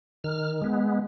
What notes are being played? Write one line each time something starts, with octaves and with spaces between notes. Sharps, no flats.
D#3 F6
G#3 B3